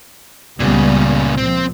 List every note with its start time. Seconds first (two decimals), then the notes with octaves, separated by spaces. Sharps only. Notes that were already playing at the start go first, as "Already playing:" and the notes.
0.60 C#2 A#2 C#3 G3 B3
1.38 A#2 F3 C4